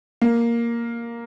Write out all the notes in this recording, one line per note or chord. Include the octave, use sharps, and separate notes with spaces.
A#3